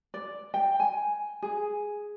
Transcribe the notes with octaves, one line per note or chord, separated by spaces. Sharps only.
D5
G5
G#5
G#4